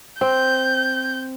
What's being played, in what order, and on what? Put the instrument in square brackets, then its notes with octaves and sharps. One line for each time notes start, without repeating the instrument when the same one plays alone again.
[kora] C4 [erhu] G6